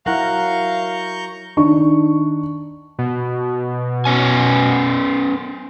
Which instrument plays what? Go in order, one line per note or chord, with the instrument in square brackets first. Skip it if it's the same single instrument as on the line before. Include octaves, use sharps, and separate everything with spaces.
[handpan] F#3 E4 [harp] A#4 F#5 [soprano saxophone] F5 [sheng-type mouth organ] A#5 C#6 G6
[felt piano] D#3 D4 C#6
[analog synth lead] B2
[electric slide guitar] B3 C#4 G#5